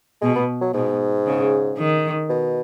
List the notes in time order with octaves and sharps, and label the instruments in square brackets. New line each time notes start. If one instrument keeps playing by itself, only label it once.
[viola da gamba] B2 [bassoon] G#3
[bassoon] B3
F#3
[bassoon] G#2 [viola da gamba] B2
[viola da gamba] C#3
D#3
[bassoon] B2